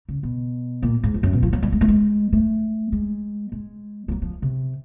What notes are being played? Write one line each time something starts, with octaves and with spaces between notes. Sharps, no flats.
C#3
B2
A#2
G#2
F2
F#2
B2
F3
F#3
G3
G#3
A3
G#3
A3
G#3
G#3
F3
F#3
F3
C3